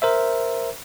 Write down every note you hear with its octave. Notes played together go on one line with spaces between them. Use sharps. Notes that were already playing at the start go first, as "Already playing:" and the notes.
A#4 C5 E5